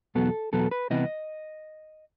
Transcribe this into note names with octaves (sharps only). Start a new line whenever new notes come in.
E2 B2 F#3 B3 A4
E2 B2 F#3 B3 A4
B4
C2 C3 E3 B3 D#5